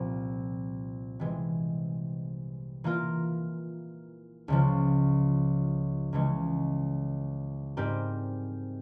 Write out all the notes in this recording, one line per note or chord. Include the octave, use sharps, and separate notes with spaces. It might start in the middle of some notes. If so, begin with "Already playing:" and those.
Already playing: C2 A#2 F3 C4
C3 E3 G#3
E3 A#3 F4 A#4
C#2 C#3 F3
C#2 C#3 E3 G#3 C#4
G#2 G3 C4 G4 A#4